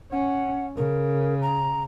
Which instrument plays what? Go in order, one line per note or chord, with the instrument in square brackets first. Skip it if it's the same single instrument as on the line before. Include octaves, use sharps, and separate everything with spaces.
[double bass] C#4 [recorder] F#5
[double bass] C#3 [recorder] A#4
[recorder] A#5